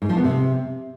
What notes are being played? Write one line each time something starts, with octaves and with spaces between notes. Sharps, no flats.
G#2
F3
B3
C3